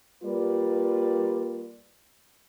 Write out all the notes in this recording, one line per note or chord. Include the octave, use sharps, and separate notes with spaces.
G3 A#3 F4 B4 D5